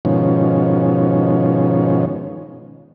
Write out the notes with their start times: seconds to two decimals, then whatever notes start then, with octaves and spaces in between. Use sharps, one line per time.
0.05 G#2 B2 D#3 F3 C#4